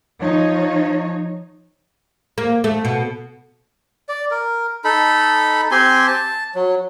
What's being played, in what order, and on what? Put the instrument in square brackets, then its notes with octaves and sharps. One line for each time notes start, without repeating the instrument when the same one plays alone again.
[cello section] F3 D#4 C#5
[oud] A#3
A3
B2
[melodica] D5
A#4
D#4 A4 B5
C4 G4 G#5 C6
A5
F#3